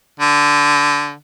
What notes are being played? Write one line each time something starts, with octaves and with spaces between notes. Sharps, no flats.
D3